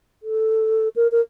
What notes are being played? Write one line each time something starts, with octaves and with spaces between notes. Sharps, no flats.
A4
A#4
A#4